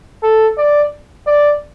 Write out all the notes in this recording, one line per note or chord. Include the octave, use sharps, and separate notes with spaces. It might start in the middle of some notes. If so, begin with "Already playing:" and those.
A4
D5
D5